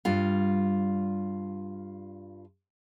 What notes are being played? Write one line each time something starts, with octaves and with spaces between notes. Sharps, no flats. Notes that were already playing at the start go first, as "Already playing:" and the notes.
G2 G3 F4 F5